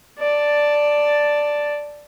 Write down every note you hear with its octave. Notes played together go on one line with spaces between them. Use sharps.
D5 A5